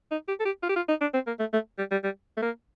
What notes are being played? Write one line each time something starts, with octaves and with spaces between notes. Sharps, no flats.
D#4
G4
A4
G4
F4
G4
F4
D#4
D4
C4
A#3
A3
A3
G3
G3
G3
A3
A#3